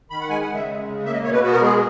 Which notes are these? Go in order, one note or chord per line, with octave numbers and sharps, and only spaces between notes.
D#3 B5
F#5
G#3 G#5
F#5
C#3
E5
G#3
C#3
A#3 E5
D#5
B2 C#5
B4
B3 F#4
A#4
G#3 G#4